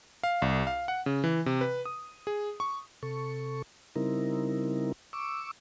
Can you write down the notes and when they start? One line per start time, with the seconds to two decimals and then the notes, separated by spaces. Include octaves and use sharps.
0.23 F5
0.42 C2
0.67 F5
0.88 F#5
1.06 C#3
1.24 E3
1.46 C3
1.61 B4
1.85 D#6
2.27 G#4
2.60 C#6
3.03 C3 A4 C#6
3.96 C#3 G3 C4 D#4 E4 A#4
5.13 C#6 D6 E6